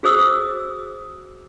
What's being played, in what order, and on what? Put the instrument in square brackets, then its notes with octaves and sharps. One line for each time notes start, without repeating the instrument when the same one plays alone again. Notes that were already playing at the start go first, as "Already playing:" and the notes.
[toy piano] F#4 G#4 C5 D#6 E6